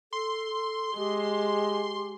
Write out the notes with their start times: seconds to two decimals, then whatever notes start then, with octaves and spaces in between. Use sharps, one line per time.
0.13 A4 C6
0.97 G#3 G4